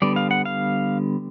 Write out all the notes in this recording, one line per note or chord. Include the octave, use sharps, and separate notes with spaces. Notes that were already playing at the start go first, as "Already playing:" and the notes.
D3 G3 B3 D5
F5
F#5
F5